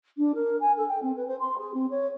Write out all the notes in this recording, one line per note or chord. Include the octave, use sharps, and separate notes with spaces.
D4
A#4
G#5
A4
G5
C4
B4
C5
C6
G#4
C4
C#5